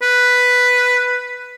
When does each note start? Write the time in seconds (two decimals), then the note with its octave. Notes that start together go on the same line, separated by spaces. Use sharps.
0.02 B4